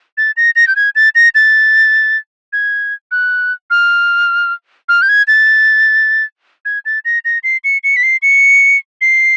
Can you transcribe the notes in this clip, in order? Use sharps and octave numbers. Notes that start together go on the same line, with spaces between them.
A6
A#6
A#6
G6
G#6
A6
A#6
A6
G#6
F#6
F6
F6
G6
G#6
A6
G#6
A6
A#6
A#6
C7
C#7
C#7
B6
C7
C#7
C7